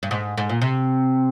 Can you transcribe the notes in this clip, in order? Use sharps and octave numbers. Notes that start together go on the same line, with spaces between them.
G2
G#2
G#2
A#2
C3